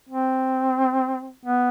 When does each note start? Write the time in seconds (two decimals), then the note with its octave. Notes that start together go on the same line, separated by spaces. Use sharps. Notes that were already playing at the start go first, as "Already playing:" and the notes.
0.09 C4
1.46 B3